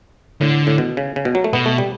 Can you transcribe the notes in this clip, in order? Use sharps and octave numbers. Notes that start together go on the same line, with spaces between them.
A2 D3
A2
B2
C#3
C#3
B2
F#3
A3
B2 B3
A3
G3